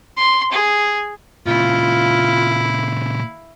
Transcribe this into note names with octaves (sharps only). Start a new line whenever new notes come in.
C6
G#4
A#2 C#3 E4 F4 F5